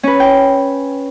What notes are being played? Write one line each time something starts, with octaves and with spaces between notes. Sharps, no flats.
C#4 B4
G5